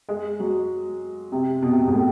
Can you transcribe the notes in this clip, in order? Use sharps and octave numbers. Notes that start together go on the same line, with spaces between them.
G#3
F#3
C3
B2
C3
B2
G#2
A2